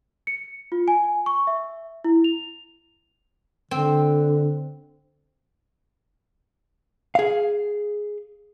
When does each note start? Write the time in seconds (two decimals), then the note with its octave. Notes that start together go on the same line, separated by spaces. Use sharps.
0.27 C#7
0.72 F4
0.88 G#5
1.26 C#6
1.47 E5
2.04 E4
2.24 F7
3.71 D3 C4
7.15 G#4 F5